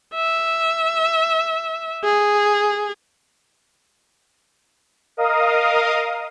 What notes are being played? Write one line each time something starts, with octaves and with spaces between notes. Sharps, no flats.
E5
G#4
A#4 D#5 F5 D#6